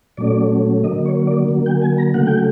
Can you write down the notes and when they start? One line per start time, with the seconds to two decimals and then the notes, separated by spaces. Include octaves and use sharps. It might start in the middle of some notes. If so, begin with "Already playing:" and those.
0.17 A#2 F#3 A3 C#4 D5
0.84 D3 F#3 A#3 D#5
1.06 C#5
1.27 D5
1.49 D3 F#3 A#3
1.66 G5
1.81 G#5
1.98 A#5
2.14 C#3 F#3 A3 F#5
2.27 G5